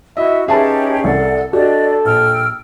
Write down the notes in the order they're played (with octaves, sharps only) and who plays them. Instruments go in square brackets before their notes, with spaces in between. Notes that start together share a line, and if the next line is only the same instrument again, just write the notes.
[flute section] E4 F#4 [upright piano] D#5 [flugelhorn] E5
[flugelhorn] C#4 [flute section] D#4 G4 C#5 [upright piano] G#4 B4 [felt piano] E5 A5
[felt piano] C2 [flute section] A4 D5 F#5
[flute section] D4 D5 D#5 [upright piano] F#4 [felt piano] G4 [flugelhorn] A4
[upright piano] A#1 [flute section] G5 E6 F6